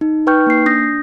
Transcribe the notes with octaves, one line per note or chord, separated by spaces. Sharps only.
D#4
D#4 B4 G5 C#6 F6 G6
A#3 C7
D4 D#6 G6 A#6